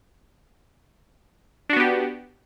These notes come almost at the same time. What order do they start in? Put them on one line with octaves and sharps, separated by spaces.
D4 F#4 B3 G4